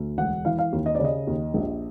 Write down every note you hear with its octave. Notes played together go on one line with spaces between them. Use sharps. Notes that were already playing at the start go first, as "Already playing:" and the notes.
Already playing: D2
E1 F#5
E3 F5
F5
D#2
D#5
D5
C#3
D#5
D#2
A#1